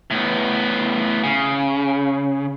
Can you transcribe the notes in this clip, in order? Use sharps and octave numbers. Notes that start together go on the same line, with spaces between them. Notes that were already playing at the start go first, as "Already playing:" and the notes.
A2 B3
C#3